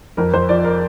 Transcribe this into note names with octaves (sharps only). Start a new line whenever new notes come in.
F2 A#4
F2 C5
F3 D5
A#4